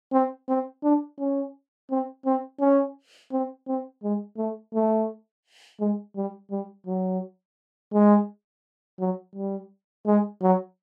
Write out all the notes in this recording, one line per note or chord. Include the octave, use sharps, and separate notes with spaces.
C4
C4
D4
C#4
C4
C4
C#4
C4
C4
G#3
A3
A3
G#3
G3
G3
F#3
G#3
F#3
G3
G#3
F#3